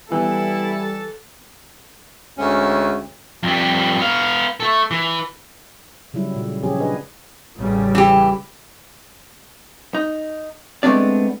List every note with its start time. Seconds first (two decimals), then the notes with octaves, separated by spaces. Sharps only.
0.12 E3 G3 B3 E4 A4
2.38 D2 D3 G#3 C#4
3.43 F2 G3
3.99 B3 F5
4.60 A3 A4
4.91 E3
6.14 C#3 F#3 G3 E4
6.35 A#2 C#3 A3
6.63 C#3 F3 A#3 C#4 G4 G#4
6.78 D4 G#4 B4 D#5
7.56 A1 C#3 G3
7.95 E3 G4
9.95 D#4
10.83 G#3 A3 B3 C4 D4 D5